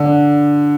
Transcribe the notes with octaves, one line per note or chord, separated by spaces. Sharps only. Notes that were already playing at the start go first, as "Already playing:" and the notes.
Already playing: D3